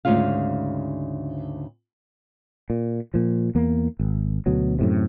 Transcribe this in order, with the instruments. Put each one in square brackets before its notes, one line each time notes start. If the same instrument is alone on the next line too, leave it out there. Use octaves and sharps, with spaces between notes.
[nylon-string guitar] D2 G#2 C#3 F4 F5
[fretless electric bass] A#2
A#2 F3
E2 A#3
G#1
D2 B2 F#3
F#2 A2 C3